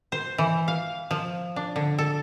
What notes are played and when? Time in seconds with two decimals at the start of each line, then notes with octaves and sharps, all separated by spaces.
0.12 C5
0.38 E3
0.68 F5
1.11 F3
1.56 D4
1.76 D3
1.98 A4